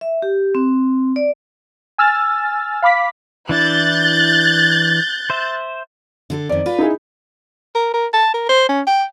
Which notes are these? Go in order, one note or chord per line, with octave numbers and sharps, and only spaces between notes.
E5
G4
C4
D5
G#5 E6 F6 A6
F5 B5 D6 B6
E3 D4 E4 F#6 G6 A6
C5 E5
D3 G#4 A4
F2 D#3 D5
F4 B4
D#4 E4 G#4
A#4
A#4
A5
A#4
C5
C#4
G5